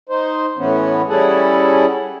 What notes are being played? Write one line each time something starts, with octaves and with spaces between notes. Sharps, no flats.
D#4 C5
A2 E3 B3 C#4
G3 C#4 E4 G#4 A4 F#5